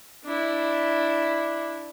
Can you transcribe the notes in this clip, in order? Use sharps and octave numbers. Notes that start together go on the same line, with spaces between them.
D4 E4